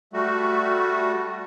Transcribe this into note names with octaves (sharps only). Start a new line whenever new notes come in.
G3 A3 F#4